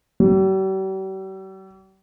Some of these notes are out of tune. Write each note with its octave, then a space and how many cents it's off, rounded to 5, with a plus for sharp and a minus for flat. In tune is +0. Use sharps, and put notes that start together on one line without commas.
G3 -45